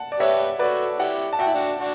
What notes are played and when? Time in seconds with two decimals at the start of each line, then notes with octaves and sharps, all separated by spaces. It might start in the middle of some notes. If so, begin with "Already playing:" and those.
Already playing: F#5 A5
0.12 D5
0.19 G4 B4 C#5 E5
0.59 F#4 A4 B4 D5
0.99 E4 G4 D5 F#5
1.33 A5
1.39 F#4 E5 G5
1.47 E4
1.54 D4 F#4
1.79 D4 F#4